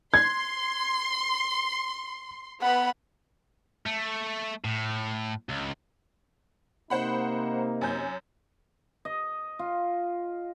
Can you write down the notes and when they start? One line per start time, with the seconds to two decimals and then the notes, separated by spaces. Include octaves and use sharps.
0.14 C6 G#6
2.62 B3 F#5 B5
3.86 A3
4.65 A2
5.49 C#2
6.90 C3 A#3 D#4 C5 F#5 B5
7.81 F#2 G#5 G6
9.05 D#5
9.59 F4